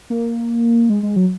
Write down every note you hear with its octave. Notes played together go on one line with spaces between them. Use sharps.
A#3
G#3
G#3
F#3